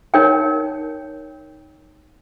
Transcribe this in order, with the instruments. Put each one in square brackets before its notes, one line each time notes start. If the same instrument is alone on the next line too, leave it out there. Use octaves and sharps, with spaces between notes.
[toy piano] D#4 A#4 C#5 G5